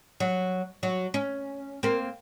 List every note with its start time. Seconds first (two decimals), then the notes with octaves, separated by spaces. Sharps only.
0.20 F#3
0.83 F#3
1.14 C#4
1.83 A#3 C4